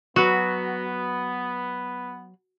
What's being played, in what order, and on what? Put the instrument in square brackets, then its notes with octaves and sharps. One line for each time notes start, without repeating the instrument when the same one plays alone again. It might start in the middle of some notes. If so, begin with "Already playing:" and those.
[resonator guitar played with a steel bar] F#3 B4 [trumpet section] B3 [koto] F#4